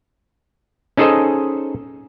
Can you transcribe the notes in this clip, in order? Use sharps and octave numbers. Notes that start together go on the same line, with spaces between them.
C#4 D#4 G#4 A4 C5 D#5